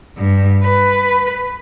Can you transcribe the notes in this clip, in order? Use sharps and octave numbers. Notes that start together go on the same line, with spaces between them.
G2
B4